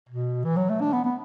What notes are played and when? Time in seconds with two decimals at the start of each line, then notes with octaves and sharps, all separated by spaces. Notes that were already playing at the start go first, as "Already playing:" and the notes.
0.09 B2
0.45 E3
0.56 F#3
0.70 A3
0.81 D4
0.93 B3
1.05 B3